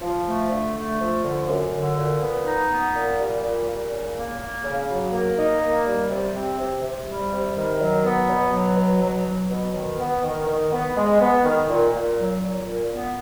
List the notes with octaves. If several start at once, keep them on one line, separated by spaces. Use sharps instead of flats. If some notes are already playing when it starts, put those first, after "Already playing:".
F3
A3
D3
A3
F3
D3
F#2
D3
A#2
B3
D#4
B3
A#2
G3
A#2
A#2
C#3
A#3
A#3
C#3
F#3
A#3
D#4
A#3
G3
C3
C4
C3
C3
G3
C3
D#3
F#3
B3
B2
F#3
B2
F#3
F#3
B2
D#3
B3
D#3
D#3
B3
G#3
B3
D#3
A#2
A#2
F#3
A#2
A#2
B3